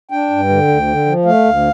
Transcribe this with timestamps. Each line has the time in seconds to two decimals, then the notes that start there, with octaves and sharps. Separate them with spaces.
0.11 D4 G5
0.30 G2
0.49 D3
0.68 D2
0.88 D3
1.06 F3
1.25 A3 F5
1.44 D2